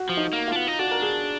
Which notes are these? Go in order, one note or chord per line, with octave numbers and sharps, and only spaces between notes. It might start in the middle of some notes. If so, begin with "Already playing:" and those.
Already playing: F#4
F3
D#4
A#3
D4 F4
B3
D#4
D4 F#4
A#4
G#4